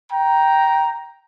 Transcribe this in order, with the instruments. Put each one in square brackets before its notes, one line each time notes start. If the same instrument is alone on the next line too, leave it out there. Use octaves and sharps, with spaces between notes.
[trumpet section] G5 A#5